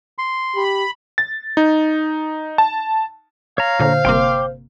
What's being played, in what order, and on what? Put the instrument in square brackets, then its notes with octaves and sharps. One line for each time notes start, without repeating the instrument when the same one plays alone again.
[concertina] C6
[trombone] G4 [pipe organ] B5
[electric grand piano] A6
D#4
A5
[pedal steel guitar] C#5 A#5 [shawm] F5
[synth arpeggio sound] A#2 D3 [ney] C5
[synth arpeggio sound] G1 C3 A#3 [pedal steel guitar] G5 C6 D6